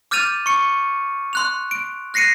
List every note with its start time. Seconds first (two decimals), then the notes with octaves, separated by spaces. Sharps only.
0.11 D6 F6 G6 A6 D#7 F7
0.46 C#6 C#7
1.33 C6 F#6 F7
1.71 D7
2.14 F#6 A#6 C7 C#7 D#7